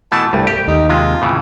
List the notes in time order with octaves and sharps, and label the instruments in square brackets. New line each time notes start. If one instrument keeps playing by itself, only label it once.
[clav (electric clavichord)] B2 E3 A3 [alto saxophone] A5
[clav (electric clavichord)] C2 G2 G3 [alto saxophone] A3
[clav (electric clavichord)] G4
[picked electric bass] D#2 [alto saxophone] D#4
[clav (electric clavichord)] C3 G#3 [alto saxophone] F4
[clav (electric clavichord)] A2 C#3 E3